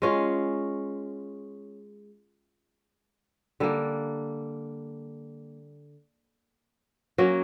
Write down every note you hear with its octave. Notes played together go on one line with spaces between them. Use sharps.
G#3 C#4 F4
D3 G3 A#3
F#3 A#3 C#4